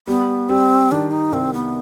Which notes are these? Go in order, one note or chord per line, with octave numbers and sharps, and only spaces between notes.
G3 B3
G3 C4
D#3 D4
D#4
C2 C4
B3